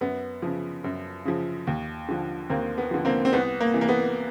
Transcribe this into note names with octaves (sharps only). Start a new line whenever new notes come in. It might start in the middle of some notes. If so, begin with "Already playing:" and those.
F#2 B3
C#3 F3
F#2
C#3 F3
D#2
D3 F3
D#2 A#3 C4
B3
D3 F3
A#3 C4
C4
C2 B3
A#3
C3 E3
A#3
B3